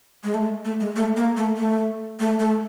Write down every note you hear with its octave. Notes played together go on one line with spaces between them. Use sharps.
G#3
A3
A3
G#3
A3
A#3
A3
A3
A3
A3